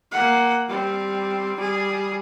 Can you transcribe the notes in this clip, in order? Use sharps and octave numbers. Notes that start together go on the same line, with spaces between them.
A#3 F#5
G3 C4
G3 G#4